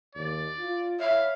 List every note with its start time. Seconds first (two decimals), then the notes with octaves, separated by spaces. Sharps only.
0.15 D#2 D5
0.59 F4
1.00 C#5 E5 F5